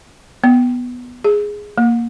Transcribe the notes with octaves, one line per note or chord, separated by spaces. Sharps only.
B3
G#4
A#3